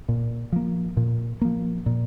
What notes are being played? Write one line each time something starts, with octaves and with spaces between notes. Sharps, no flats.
A#2
F3 A#3
A#2
F3 A#3
A#2